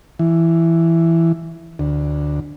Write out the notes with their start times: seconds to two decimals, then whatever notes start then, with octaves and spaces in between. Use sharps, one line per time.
0.19 E3
1.79 D2